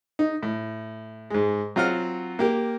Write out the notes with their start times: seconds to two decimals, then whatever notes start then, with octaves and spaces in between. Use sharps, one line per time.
0.19 D#4
0.43 A2
1.30 G#2 G#3
1.76 F#3 C4 F4 F#5 F6
2.39 A#3 G4 A#4